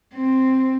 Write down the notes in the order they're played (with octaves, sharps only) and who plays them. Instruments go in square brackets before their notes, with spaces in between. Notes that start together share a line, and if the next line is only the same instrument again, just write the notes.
[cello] C4